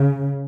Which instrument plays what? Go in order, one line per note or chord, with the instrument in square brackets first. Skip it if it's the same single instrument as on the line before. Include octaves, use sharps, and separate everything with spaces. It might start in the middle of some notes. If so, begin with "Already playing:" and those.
Already playing: [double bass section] C#3